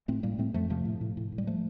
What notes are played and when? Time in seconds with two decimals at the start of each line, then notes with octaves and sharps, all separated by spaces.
0.08 A2 A3 C4
0.23 A2 G3 A#3
0.38 A2 A3 C4
0.54 F2 F3 A3
0.70 C3 F3 A3
0.85 A2
1.01 A2
1.17 A2
1.32 A2
1.38 G3
1.47 F3 A3